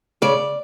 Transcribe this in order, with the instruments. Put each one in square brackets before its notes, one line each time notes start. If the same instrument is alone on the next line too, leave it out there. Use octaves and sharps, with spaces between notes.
[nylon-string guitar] C#3 D5